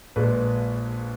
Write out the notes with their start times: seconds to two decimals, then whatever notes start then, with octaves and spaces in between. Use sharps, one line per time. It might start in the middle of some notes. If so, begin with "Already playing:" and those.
0.16 A#1 A#2 G#3 B4